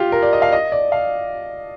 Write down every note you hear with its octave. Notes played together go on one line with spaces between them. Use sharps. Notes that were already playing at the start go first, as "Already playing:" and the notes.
Already playing: F4 G4
A#4
D5
D#5
F5
D#5
D5
F5